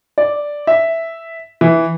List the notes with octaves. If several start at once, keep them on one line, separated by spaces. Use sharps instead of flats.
D5
E5
E3